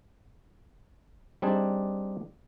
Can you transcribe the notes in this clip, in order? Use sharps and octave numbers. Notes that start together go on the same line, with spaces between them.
G3 C4 D4 D#4 G#4 D5